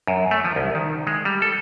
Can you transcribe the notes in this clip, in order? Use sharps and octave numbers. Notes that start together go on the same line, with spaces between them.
F#2
A3
F3
C2
D#3
G#3
G3
A4